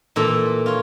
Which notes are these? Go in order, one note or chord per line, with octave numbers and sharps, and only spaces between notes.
A#2 E3 A4 A#5
F4 C#5